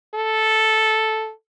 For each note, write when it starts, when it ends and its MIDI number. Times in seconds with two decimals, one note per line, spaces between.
0.15 1.32 69